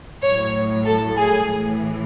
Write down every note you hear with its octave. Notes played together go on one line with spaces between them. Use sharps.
A2 F#3 C#5
A4
G#4
A2 E3